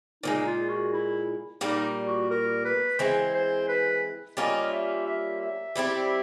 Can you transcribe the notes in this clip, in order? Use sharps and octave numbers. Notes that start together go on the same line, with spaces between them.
A#2 F3 G#3 D#4
F4
F#4
E4
A#2 G3 A#3 D#4
F#4
A#4
B4
E3 G#3 C4 C5
C5
B4
G3 A#3 C#4 F4 D#5
E5
E5
E5
G3 C4 E4 G4